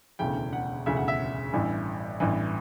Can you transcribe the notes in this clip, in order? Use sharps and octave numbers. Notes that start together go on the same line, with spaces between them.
E1 D2 C#3 E3 G5
F#5
E1 D2 C#3 E3 E5
F#5
E5
A1 G2 E3
A1 G2 E3